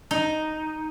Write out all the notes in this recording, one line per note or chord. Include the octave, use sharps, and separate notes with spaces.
D#4